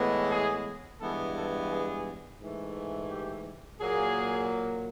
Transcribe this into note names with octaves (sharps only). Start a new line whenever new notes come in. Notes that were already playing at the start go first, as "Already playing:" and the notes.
Already playing: A2 E3 G#3 B3
G#4
G2 E3 G#3 B3 A4
A4
G#4
G#2 E3 A3
G4
A#2 F#3 A#3 G#4